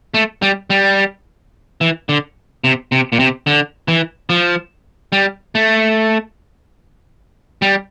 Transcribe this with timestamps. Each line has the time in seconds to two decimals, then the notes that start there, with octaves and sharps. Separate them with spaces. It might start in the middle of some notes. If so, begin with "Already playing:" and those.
0.14 A3
0.42 G3
0.70 G3
1.81 E3
2.09 D3
2.64 C3
2.92 C3
3.13 A#2
3.19 C3
3.47 D3
3.88 E3
4.30 F3
5.12 G3
5.55 A3
7.62 G3